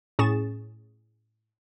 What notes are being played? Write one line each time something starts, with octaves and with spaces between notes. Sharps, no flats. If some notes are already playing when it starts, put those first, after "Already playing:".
A2 C#4 G#4 C#6 A6 E7